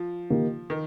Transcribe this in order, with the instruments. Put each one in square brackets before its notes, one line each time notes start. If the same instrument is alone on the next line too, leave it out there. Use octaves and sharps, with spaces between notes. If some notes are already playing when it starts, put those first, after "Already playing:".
Already playing: [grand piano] F3
[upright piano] D#3 A#3 D#4 G4
[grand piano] D#3